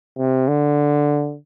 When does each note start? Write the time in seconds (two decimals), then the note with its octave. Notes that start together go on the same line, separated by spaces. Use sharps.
0.19 C3
0.48 D3